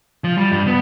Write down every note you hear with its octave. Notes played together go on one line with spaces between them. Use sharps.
F3
G3
G2
B3